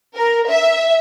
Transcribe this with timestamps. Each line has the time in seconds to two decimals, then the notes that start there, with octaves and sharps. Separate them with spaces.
0.16 A#4
0.49 E5